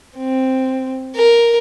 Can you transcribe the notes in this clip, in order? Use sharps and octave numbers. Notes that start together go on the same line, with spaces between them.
C4
A#4